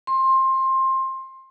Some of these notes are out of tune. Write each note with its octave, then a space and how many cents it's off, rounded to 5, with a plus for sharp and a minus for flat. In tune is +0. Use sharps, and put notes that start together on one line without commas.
C6 +20